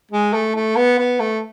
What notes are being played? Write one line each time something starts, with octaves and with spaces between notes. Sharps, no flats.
G#3
A3
A3
B3
B3
A3